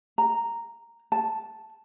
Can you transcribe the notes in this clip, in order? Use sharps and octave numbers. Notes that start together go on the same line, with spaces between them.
A#5
A5